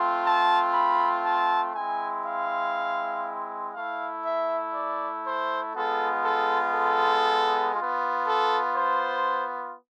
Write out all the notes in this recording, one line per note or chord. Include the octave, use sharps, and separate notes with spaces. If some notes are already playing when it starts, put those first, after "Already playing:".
Already playing: A3 C4 F4
A5
B5
A5
G#3 C4 E4 G#5
F5
A3 E4 F5
E5
D5
C5
G#3 B3 F4 A4
A4
A4
B3 F4
A4
C5